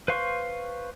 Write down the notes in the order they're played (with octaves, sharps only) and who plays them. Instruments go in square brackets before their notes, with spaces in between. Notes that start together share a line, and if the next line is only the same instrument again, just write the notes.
[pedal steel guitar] B4 C5 F5 C6 C#6